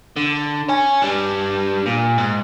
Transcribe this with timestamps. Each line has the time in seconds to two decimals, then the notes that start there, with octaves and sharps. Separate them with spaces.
0.16 D3
0.69 C#5 G#5
1.02 G3 D4
1.86 A#2
2.18 G#2